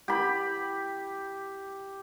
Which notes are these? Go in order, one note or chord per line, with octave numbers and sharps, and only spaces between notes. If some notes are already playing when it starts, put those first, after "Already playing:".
G4 B5